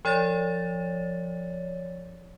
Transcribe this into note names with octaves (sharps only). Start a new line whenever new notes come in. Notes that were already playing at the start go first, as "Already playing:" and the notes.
F3 C#5 D5 A6